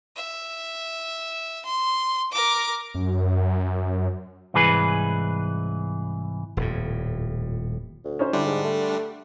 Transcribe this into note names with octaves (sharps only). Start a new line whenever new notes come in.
E5
C6
A#4 D6
F#2
C2 G#2 E3 G#4 B4
D#1 F2 A2
D2
C#4 D#4 C5
D3 G3 D4 E4
G#2
A3